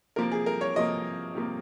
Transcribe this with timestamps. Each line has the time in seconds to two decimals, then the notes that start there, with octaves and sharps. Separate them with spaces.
0.16 C3 F3 A#3 A#4
0.32 G#4
0.46 A#4
0.61 C#5
0.75 C3 F3 A#3 D#5
1.35 C3 F3 A#3